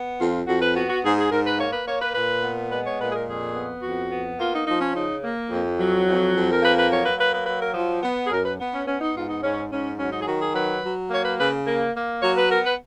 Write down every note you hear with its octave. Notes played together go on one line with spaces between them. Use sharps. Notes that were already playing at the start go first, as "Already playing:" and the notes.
Already playing: B3
F2 F4
F2 F#4
B4
B3 F#4
F#4
G#2 G#4
G#4
G#2 A#4
B4
A#3 C#5
B4
A#3 C#5
B4
A#2 B4
B3
G#3 B4
C#5
A#2 B4
G#4
A#4
F2 G#4
B3
F2 F#4
B3
A#3 F4
D#4
F3 D#4
C#4
C#3 D#4
A#3
F2
F#3
F2
F2
A#4
A#3 B4
B4
F#3 C#5
B4
A#3 B4
B4
F#3 B4
A#4
F3
B3
G#4
F#2 A#4
B4
B3
C#4
B3 C#4
D#4
G#2 F4
D#4
G#2 C#4
G#2 C#4
F#3 C#4
D#4
G#4
D#3 F#4
G#4
F#3 B4
F#3
A#3 C#5
B4
C#3 B4
A#3
A#3
F#3 C#5
B4
B3 A#4
B4